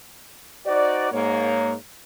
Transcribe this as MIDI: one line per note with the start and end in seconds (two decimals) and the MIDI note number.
0.66 1.12 63
0.66 1.12 66
0.66 1.12 72
0.66 1.12 74
1.12 1.73 44
1.12 1.73 58
1.12 1.73 73